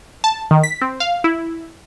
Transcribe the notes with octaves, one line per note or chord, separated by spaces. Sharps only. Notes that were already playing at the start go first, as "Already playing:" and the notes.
A5
D#3
B6
C4
F5
E4